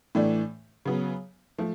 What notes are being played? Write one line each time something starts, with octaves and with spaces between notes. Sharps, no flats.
A2 E3 A3 D4
C#3 F#3 B3
F3 A3